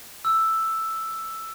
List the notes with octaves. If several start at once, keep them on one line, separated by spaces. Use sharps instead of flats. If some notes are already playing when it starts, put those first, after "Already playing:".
E6